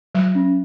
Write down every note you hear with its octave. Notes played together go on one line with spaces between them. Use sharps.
F#3
C#4